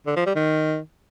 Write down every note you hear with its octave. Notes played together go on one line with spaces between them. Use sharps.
D3
F3
G3
D#3